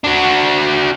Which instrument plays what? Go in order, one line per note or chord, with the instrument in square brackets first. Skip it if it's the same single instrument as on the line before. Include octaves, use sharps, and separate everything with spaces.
[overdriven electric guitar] D4 F#4